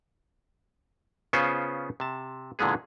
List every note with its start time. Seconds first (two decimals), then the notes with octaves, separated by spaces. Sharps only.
1.33 C#3 B3 C#4 F4 C5
2.00 C3 A5
2.59 A#2 D3 E3 G#3 B3 G#4